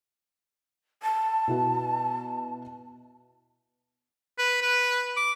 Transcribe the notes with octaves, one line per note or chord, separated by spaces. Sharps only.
A5
B2 E4 F#4
B4
B4
D6